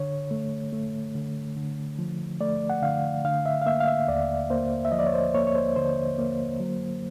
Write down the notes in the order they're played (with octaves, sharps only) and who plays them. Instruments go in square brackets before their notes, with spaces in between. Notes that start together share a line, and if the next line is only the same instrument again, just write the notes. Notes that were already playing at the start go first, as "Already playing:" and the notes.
Already playing: [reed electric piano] D3 C#5
A3
A3
D3
D3
F3
A3 D5
F#5
D3 F5
D3 F5
E5
F5
A#3 E5
F5
E5
D#2 D5
A#3 C5
E5
F3 D#5
D5
C#5
C5
A#3 C#5
C#5
C5
D3 C5
A#3
F#3